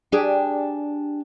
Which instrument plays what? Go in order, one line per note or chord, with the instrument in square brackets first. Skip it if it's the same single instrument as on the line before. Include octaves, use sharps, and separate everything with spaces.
[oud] D4 G4 G#4